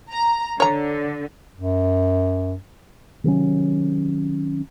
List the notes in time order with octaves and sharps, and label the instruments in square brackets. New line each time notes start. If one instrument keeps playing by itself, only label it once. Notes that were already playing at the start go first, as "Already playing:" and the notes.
[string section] A#5
[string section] D3 [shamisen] C#5 A#5
[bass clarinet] F#2
[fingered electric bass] C3 D#3 F#3 C#4